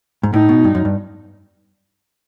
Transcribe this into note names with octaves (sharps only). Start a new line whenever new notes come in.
G#2
A2 D#4
B2
G2
F#2
G2